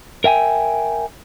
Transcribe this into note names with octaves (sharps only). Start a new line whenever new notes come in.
A#4 E5 G5 G#5